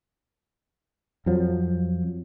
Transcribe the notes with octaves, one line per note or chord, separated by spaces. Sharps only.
F2 F3 F#3